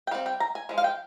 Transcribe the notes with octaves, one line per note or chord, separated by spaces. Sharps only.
G5
G3 C4 F5
G5
A#5
G#5
F3 G#3
F5
G5